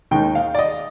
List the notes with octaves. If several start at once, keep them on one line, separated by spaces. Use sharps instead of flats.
D#2 D#3 G#3 D#4 G5
F5
D5
D#5